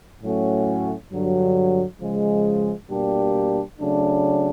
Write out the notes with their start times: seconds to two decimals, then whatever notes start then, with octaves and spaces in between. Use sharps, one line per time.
0.23 A2 F#3 A3 C#4 F#4
1.12 G2 D3 F#3
2.01 C#3 F3 G#3
2.90 B2 G3 A#3 D4 G4
3.80 C#3 F#3 A3 D4